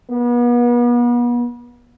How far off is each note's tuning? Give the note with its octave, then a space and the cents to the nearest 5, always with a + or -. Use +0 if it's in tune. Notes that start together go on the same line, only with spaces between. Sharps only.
B3 -40